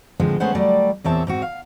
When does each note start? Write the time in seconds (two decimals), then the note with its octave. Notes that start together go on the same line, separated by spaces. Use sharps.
0.20 A2 D3 F3 G#3 C4
0.40 G#3 A3 B3 C#4 C5 F#5
0.55 F#3 G3 A3 D5
1.04 E2 A#2 C4 C#5 E5 A5
1.27 G#2 C4 F#4
1.42 F5